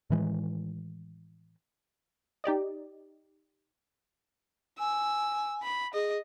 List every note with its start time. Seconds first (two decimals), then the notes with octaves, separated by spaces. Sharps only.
0.10 A2 D#3 E3 G#3
2.44 D#4 G4 D5 D#5
4.79 G#5 E6
5.63 B5
5.94 G#4 D#5